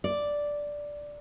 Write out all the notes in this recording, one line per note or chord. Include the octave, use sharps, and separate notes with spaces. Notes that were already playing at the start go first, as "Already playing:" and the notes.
D5